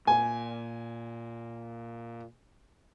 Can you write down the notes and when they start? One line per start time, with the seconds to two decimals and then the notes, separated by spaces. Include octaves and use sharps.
0.07 A#2 G#5